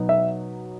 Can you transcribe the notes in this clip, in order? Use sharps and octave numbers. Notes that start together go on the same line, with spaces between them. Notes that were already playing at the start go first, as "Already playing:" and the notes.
Already playing: B2 F#3 B3 D#4
E5